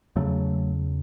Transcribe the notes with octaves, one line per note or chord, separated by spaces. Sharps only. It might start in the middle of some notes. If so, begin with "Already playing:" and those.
E2 C#3 F#3 A3